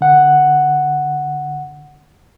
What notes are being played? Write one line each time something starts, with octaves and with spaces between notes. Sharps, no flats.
D3 F#5